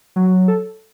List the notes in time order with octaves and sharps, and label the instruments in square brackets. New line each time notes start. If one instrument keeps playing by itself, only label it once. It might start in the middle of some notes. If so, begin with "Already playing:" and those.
[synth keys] F#3
A4